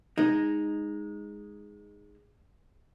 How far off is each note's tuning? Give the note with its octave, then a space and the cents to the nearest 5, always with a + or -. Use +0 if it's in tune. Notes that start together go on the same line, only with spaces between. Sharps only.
G#3 -10 D#4 +0